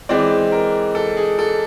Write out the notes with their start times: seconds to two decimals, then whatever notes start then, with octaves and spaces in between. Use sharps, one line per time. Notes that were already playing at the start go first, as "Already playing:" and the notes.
0.09 E3 G#3 C4 D5
0.52 A#4
0.95 A4
1.17 G#4
1.39 A4